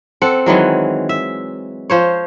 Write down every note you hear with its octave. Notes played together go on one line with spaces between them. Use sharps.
C4 A4 F#5
D#3 E3 F#3 G#3
E5
F3 C5 C#5